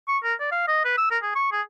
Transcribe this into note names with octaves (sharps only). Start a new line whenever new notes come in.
C#6
A#4
D5
F5
D#5
B4
E6
A#4
G#4
C#6
G#4